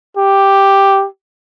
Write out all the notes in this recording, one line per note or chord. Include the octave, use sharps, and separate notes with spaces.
G4